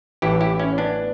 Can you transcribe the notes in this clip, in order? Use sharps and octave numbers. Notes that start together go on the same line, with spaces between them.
A1 A2 E3 E4 G4
E4 G4
C#4 E4
B3 D4